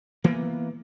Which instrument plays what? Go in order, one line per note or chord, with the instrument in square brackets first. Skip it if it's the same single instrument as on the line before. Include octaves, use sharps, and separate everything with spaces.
[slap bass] E3 A#3 B3